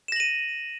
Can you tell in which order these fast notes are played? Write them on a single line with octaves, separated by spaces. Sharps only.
E7 A#6 F#7 D#7